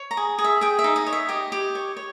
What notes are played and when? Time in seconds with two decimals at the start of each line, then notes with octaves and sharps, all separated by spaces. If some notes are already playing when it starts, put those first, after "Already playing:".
Already playing: C#5
0.11 A#5
0.17 G#4
0.39 G#4
0.44 E5
0.61 G#4 G5
0.79 E5
0.84 D#4
0.96 D#5
1.06 C#5
1.13 E5
1.29 G4 D#5
1.52 G4
1.75 C#5
1.97 C#5